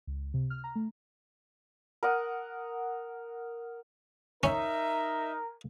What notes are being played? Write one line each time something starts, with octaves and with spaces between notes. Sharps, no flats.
C#2
C3
F6
A#5
A3
A#4 F#5 D#6
C#4 D#4 A#4 E5